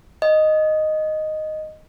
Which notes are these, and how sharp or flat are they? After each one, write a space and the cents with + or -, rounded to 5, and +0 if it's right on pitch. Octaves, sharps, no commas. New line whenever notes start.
D#5 -5